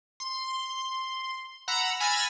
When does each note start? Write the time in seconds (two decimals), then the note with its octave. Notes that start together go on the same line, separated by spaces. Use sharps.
0.20 C6
1.68 F#5 A#5 B5 E6
2.00 G#5 B5 E6 F6 A6 A#6